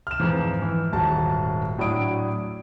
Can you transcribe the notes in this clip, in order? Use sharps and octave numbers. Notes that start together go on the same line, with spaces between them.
F6 E7
F2 G#2 E3 F3
E3
D#1 G#2 F#4 A5
A2 F#3 D4 E4 D#6 D7